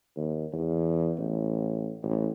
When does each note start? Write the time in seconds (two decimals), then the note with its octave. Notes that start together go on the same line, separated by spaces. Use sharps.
0.16 D#2
0.53 E2
1.18 A1
2.03 A1